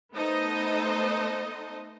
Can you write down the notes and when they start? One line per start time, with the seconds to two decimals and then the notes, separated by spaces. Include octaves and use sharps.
0.14 A3 B3 D#4 A4 C5 D#5